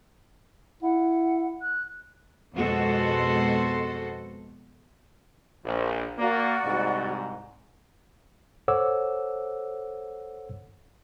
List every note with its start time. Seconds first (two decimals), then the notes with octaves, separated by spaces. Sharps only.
0.83 E4 F#5
1.62 F#6
2.55 F2 B2 G#3 F#4 A4 C5
5.64 A#1
6.18 A#3 F#4 D5
6.64 C2 G#2
8.68 A4 C5 C#5 F#5 D6 E6